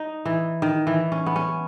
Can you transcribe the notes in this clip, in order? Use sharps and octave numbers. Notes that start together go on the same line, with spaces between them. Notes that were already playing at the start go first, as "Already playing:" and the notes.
Already playing: D#4
E3
D#3
E3
C#4
B3
C#4